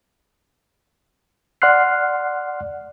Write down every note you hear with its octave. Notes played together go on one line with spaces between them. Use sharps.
D5 F#5 C6 F6 F#6 C7